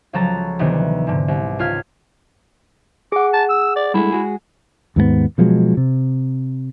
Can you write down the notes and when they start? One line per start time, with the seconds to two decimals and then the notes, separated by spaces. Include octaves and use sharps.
0.13 C#2 F3 F#3 A4 A#5 A6
0.59 D2 C3 D#3 E3 B3
1.07 G#2 D3
1.28 C2
1.59 C#2 F4 F6 G#6 B6
3.12 G#4 F#5 D6
3.33 A5
3.50 E6
3.76 D5
3.94 G2 G#3 A3 E4
4.12 G#3 F#4 G#4
4.96 D#2 G#2 G#3 B3
5.38 B2 F3 F#3 G#3
5.77 C3